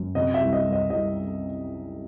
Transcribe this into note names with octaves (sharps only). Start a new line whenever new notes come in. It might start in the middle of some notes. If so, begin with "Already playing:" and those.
Already playing: F#2
C3 D#5
E5
C2
D#5
G3
D#5
C2 D#5